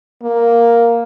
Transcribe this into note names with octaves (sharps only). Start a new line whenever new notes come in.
A#3